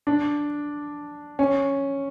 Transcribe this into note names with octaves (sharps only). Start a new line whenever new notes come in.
D4
C#4